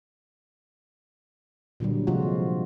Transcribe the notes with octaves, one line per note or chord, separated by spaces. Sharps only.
A#2 D3 F#3 G3
C3 F3 G#3 F4 F#4